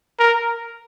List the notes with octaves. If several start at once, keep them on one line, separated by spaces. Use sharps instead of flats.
A#4